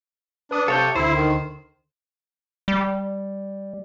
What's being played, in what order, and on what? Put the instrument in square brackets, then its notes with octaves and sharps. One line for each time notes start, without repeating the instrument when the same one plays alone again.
[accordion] D4 [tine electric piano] B4 D#6
[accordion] C3 [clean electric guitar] A4 C#5 [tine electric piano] F5 A5 G6
[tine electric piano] D2 D3 [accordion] E4 [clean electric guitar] C5
[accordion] D#3
[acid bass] G3